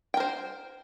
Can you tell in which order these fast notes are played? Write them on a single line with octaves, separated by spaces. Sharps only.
G5 A#4 C5